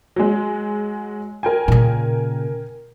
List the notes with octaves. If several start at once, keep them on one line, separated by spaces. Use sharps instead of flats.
F#3 G#3
A#4 G5 G#5
A#2 C#3